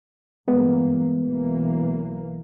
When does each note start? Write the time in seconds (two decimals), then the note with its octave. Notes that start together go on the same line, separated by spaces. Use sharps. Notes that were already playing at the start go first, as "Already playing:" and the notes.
0.48 G2 E3 G#3 A#3 B3
1.26 B1 E3 A#3